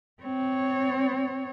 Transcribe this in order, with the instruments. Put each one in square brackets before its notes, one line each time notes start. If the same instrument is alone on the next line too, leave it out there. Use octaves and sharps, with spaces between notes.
[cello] C4 C#5